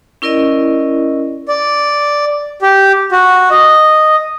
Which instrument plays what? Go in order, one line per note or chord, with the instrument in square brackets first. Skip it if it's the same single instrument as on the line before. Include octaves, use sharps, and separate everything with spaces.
[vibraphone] C#4 E4 A#4 D5 D#5
[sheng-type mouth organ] D5
G4
F#4
D#5